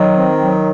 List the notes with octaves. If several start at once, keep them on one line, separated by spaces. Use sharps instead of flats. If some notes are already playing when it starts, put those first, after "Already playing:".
Already playing: D#3 F#3
C4
F#3